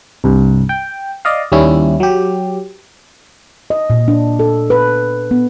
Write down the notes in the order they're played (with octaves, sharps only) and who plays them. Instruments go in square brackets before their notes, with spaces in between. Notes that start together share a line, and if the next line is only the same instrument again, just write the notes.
[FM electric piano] C2 G2
G5
D5 D#5 F5
D#2 G3 C#4 E4
F#3 G4
[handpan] D#5
A#2
D4
A4
B4
B3